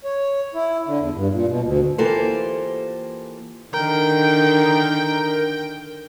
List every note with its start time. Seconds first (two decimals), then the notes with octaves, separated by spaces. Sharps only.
0.04 C#5
0.54 E4
0.87 D3
1.00 E2
1.15 G2
1.32 A#2
1.48 B2
1.63 D2
1.98 E3 A#3 F4 G4 A4 C5
3.74 D3 D#3 A#4 G5